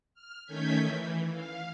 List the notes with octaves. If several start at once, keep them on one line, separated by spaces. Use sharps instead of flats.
F6
D#3 A3 C#4 G6 G#6 B6
E3
F5